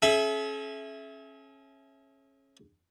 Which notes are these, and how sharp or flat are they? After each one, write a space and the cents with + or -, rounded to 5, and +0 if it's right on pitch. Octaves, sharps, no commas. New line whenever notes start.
C#4 -25 G#4 +45 E5 +0